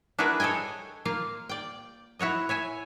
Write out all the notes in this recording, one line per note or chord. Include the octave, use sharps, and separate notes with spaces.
D4 E4 F#4 G#4 A#4 B4
A4 C#5 D#5 G5 G#5
A#3 F4 F5
D5 G5
E4 F#4 C#5 D#5
C#5 E5 G#5